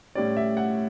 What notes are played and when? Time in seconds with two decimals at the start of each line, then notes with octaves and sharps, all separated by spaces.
0.15 A2 G3 C#4 D5
0.37 E5
0.57 F#5